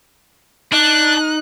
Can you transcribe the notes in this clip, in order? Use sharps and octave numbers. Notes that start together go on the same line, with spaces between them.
D4 D#4 F#6